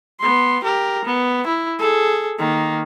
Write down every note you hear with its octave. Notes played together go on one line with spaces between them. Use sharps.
B3 C6
G4 A#4
B3
E4
G#4 A4
D#3 A#3